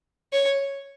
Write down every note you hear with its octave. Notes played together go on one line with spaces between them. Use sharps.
C#5